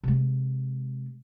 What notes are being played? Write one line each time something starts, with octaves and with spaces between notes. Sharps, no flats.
C3 G#3